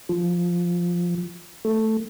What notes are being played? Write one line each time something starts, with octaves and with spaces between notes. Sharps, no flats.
F3
A3